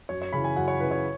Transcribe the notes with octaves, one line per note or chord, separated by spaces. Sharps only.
F#2 C#5
C#5
C#3 E3 B5
G#5
F#2 F#5
C#5
C#3 E3 B4
C#5